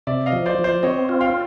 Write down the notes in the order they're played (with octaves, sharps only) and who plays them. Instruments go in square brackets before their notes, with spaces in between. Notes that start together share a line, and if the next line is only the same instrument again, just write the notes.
[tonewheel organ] C3 [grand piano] D5 E5
[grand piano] D#5 F5
[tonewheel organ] F3
[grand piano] C5 D5
[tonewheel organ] F3
[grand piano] C5 D5
[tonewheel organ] C4 [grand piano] C#5 D#5
[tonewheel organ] F4
[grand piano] F5 G5